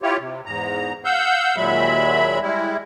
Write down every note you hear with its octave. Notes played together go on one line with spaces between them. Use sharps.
E4 F4 G4 C#5
C3
E2 G#2 A#5
F5 F#5 E6 G6
D#2 A#2 F#3 G#3 E5 B5
G3 G#3 E4